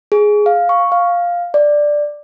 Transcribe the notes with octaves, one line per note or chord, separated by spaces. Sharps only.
G#4
F5
C#6
F5
D5